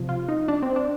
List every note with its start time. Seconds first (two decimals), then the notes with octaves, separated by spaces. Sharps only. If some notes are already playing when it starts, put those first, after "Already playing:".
Already playing: C3 F3
0.09 F4
0.28 D#4
0.48 D4
0.62 C4
0.76 D4